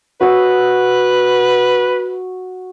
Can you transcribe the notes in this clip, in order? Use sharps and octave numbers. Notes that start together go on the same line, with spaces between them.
F#4 B4 D#6 E6